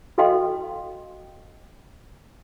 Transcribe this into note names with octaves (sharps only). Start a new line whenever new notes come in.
F#4 A4 D#5 F5 G5 C6